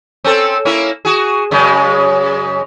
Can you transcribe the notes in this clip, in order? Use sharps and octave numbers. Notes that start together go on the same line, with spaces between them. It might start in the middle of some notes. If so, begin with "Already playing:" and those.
C4 C#4 A4
A#3 C#4 E4
F#4 G#4
F#2 C#3 G#3